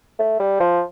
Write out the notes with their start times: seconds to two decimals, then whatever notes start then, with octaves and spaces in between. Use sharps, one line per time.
0.19 A3
0.40 G3
0.60 F3